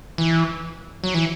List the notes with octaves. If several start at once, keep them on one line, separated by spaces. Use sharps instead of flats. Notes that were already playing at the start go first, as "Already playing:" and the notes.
E3
F#3
E3